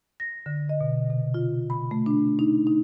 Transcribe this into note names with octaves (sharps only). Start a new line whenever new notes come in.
A#6
D3
D#5
B2
C3
F4
B5
A3
D4
D#4
D#4